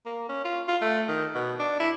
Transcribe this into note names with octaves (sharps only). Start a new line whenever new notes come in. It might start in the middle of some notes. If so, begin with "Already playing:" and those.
A#3
C#4
F4
F4
A3
D#3
B2
D4
E4